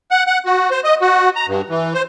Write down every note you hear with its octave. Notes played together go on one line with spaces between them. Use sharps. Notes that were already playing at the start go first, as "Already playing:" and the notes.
F#5
F#5
F#4
C5
D#5
F#4
A#5
G2
E3
C5